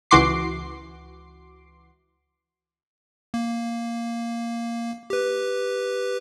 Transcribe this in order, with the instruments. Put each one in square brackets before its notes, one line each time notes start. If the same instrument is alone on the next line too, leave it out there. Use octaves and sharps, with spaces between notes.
[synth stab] C#2 E3 F#4 C6 D6 C7
[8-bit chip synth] A#3
G4 B4